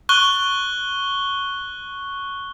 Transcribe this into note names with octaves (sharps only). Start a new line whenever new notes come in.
C#6 F#6 G7